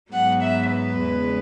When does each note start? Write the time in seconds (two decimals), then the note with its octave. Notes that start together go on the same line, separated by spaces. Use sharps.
0.12 G#2 F#3 B3 F#5
0.42 E5
0.71 B4
1.00 E2 C#3 G#3 B3